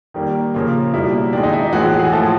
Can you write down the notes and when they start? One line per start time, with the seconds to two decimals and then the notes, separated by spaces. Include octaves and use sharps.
0.14 D#3 G3 A#3
0.54 C#3 F3 A#3
0.94 B2 G3 A#3 E4
1.33 D#3 G#3 D4
1.43 D#4
1.53 E4
1.73 A2 E3 G#3 F#4
1.86 F#4
1.99 G#4
2.13 A2 F3 A3 A4